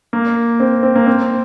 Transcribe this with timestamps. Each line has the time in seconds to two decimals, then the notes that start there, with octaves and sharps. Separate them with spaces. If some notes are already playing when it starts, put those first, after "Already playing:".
0.13 A#3
0.60 C4
0.83 C4
0.95 A#3
1.07 C4